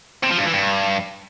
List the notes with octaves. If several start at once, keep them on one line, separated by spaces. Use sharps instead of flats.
C3
F3
G2
E3
G2